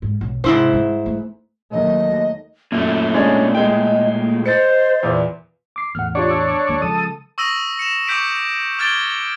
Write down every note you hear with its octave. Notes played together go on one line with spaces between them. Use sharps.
G#2
B1
G#2 C3 E4 C5
G3 D#4
A3
D#2 F#3 A3 D#5
F#2 A#2 A3 C4
G#3 C#4 D4
G#3 D#5 G5
A#3
C5 D#5 A6 C#7
E2 A#2 D5
D6 C7
E2 A2 F#5 F6
D4 F4 G4 C#5 D5
E6
D#2 G3 A#3
C#3 F3 G#3 A4 D#6
C#6 D#6 E6 A#6 D#7 F#7
C#7 E7
C#6 D6 E6 G6 B6 D7
D6 F6 G#6 A6 D7 G7